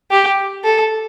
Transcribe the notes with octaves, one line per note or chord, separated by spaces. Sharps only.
G4
A4